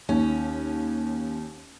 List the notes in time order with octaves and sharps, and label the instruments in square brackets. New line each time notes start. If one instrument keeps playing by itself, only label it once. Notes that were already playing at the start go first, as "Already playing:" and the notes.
[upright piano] D#2 [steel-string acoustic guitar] C#4